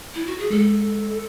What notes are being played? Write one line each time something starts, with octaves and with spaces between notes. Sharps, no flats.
E4
F#4
G#4
G#3 A4